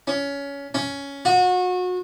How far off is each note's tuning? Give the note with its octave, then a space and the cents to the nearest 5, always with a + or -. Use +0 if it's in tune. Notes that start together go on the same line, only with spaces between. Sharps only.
C#4 +20
C#4 +10
F#4 -30